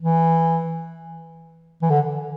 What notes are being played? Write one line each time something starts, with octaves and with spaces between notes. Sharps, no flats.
E3
E3
D3